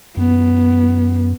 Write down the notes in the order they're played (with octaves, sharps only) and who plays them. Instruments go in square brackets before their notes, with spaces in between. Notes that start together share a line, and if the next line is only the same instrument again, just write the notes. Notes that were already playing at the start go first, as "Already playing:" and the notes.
[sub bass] F#2 [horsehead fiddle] B3